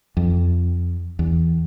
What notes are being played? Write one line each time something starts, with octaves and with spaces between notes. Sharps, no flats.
F2
E2